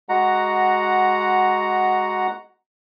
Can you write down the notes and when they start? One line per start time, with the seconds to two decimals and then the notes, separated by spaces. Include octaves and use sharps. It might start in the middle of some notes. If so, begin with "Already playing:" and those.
0.09 G#3 F#4 F#5 A#5